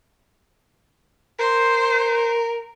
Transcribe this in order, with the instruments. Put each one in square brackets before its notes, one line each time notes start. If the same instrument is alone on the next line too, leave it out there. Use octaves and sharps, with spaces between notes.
[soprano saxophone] A#4 [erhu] C5